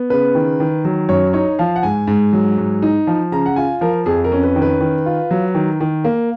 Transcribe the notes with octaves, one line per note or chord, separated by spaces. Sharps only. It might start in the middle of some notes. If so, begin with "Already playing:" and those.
Already playing: B3
C#3 B4
D#3
D#3
F#3
F#2 C#5
D#4 C#5
F3 F5
F#5
G#2 G#5
G#2
F#3
G#2
D#4
F3
C#3 A#5
F#5
F4 G#5
F3 A#4
F2 G#4
A#4
C#4
B4
D#3
B4
D#3
F4
F#3
D#3
D#3
A#3